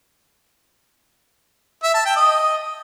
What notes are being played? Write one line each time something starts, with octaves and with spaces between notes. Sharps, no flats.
E5
A5
G5
D#5